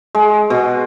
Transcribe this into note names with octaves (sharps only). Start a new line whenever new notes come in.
G#3
B2